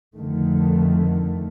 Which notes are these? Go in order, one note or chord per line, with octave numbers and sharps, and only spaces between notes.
F2 D3 D#3 A3